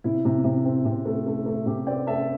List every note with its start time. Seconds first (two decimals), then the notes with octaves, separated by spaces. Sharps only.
0.04 C3 E4
0.25 C3
0.44 C3
0.65 C4
0.85 C3
1.06 A3
1.27 A3
1.46 A3
1.66 C3 G4
1.87 C4 D5 G5
2.07 A3 E5 A5